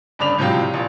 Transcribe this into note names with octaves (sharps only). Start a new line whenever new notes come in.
G1 C#3 D4 D5 B5 F7
A2 C3 F3 F#3 F4 G4
A#1